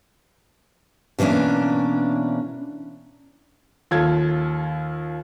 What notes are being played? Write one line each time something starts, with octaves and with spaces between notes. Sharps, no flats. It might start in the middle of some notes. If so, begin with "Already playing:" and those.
B2 E3 A#3 C#4 D4
D#2 F4 A4 G#6